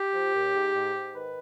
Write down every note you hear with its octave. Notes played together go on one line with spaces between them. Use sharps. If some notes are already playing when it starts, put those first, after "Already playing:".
Already playing: G4
F3
D#2
G#2
G#2
G#2
D#3 B4